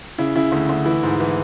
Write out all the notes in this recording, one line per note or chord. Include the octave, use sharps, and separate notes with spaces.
C#3 E4
C#3 E4
D2
D2
E3 E4
G#2
E3